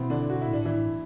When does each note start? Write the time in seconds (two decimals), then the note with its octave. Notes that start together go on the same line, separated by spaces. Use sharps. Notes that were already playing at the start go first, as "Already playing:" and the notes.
Already playing: B2 E3 B3 C4 E4
0.10 D3 D4
0.30 F#4
0.41 E4
0.48 A2 D4
0.65 E3 E4